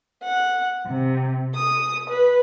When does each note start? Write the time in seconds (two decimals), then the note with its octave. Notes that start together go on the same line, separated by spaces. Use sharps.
0.22 F#5
0.87 C3
1.55 D#6
2.09 B4